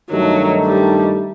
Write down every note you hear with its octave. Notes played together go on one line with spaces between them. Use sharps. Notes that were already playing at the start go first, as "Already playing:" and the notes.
G2 D#3 F#3 A3 D#4 A4
G3